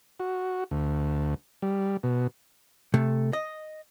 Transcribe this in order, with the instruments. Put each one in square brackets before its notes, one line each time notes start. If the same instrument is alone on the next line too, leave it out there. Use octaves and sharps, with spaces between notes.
[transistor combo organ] F#4
D2
G3
B2
[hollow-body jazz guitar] C3 A3
D#5